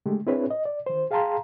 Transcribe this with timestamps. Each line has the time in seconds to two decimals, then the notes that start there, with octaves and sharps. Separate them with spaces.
0.06 D3 G#3 A3 G4
0.27 C4 D4 E4 G#4 B4 C#5
0.50 D#5
0.65 D5
0.86 D#3 C5
1.11 G#4 F5 G5 A5 A#5 C6